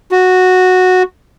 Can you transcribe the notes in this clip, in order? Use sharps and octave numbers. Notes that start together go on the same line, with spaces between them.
F#4